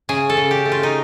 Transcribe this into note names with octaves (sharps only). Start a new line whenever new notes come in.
C#3 G#4
A4
C#3
G4
A3
F4
D#4